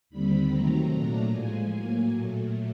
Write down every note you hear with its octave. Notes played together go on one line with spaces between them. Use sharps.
D#2 D3 G3 C4 B5
C3 D#3 F#3 A3 C4 A#5
A#2 F#3 A3 D4
A2 F3 G#3 G#5
A2 F#3 A#3
A#2 F#3 A3